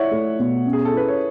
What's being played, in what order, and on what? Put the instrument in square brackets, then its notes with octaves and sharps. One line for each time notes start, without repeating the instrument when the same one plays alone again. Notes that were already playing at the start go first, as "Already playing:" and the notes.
Already playing: [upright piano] E4 [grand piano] C#5 D5 E5 F#5
[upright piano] A3
B2
C#4
[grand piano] G#4
A4
[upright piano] E4 [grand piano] B4
[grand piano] C#5